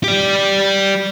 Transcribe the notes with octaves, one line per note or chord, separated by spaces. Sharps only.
G4 D5